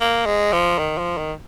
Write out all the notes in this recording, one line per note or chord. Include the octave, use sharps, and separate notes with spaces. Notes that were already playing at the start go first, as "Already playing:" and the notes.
A#3
G#3
F3
D#3
F3
D#3